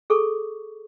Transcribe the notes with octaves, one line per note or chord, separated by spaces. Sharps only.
G#4 A4 C#6